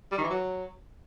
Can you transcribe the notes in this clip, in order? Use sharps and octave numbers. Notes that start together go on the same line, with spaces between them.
G3
D#3
E3
F#3